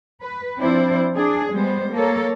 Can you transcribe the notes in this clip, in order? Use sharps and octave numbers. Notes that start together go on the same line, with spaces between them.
B4
F3 C4 D4 E4 C5
D4 G#4
G3 G#3 B3 C5
A#3 A4 A#4 C#5